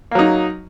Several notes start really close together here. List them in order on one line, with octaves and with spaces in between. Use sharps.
A#3 F#3 D#4